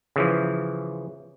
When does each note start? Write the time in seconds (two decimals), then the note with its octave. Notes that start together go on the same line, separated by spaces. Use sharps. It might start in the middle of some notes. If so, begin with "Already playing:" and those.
0.16 C#3 E3 F3